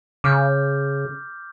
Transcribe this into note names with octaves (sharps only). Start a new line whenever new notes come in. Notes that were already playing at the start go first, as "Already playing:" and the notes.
C#3 D6 F6 G6